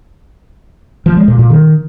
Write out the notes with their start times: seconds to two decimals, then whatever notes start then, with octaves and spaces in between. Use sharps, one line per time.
1.06 F3
1.17 G#3
1.28 A#2
1.39 A#2
1.50 D#3